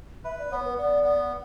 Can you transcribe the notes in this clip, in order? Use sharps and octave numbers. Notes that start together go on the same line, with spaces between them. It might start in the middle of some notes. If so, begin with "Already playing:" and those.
B4 E5
D5
B3 C#5
B4
B3 D5
B3